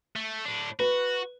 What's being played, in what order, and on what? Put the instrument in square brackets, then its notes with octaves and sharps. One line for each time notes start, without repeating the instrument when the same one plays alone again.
[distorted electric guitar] A3
A2 D4
[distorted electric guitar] F#4 [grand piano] B4